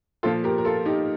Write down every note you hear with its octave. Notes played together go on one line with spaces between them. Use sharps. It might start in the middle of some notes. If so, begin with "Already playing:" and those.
A#2 F3 F4 A4
G4 A#4
A#4
F4 A4
D#4 G4